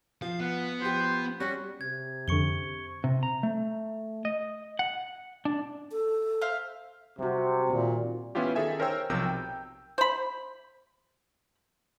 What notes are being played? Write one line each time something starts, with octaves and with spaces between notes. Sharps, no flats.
F3 F5
B3 F#5
F3 G4 C5
G3 C#4 F#4
C3 G#6
F2 D3 C#6 C#7 G7
C3
A#5
A3
D#5
F#5
D4
A4
C5 E5 F5
C3 G3 F#4
A#2 D#3 C4
E3 B3 C#4 E4 F4 G4
D#3 G#4 A4 E5 G#5
A#4 C5 C#5 G5 E6
B1 C3 F3 A#4 E6 G6
G5
C5 B5